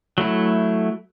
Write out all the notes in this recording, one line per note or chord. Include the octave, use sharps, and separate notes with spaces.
F#3 A3 E4